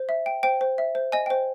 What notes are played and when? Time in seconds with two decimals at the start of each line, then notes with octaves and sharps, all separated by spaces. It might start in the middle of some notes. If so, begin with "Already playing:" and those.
Already playing: C5
0.09 E5
0.26 G5
0.43 C5 G5
0.61 C5
0.78 E5
0.95 C5
1.12 D#5 G#5
1.26 C5 G5